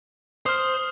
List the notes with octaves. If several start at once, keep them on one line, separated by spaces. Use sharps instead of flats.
C5 D#6 F6